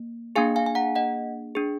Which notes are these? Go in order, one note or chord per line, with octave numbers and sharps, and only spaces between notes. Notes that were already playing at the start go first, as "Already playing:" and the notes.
Already playing: A#3
A#3 D4 G#4 F5 G#5
F5 G#5
G#5
F#5 A#5
D#5 F#5
D4 G#4